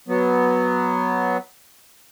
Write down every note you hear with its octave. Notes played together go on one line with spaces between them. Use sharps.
F#3 B3